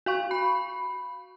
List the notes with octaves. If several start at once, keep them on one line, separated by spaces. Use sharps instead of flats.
F#4 F5 C#6
B5